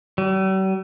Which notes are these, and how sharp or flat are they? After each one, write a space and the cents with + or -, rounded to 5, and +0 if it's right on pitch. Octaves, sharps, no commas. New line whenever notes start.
G3 -45